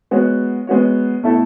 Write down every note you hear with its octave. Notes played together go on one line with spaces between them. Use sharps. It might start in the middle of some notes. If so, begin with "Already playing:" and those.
G#3 B3 F#4 C#5
G#3 B3 F#4 C#5
B2 A3 E4 A4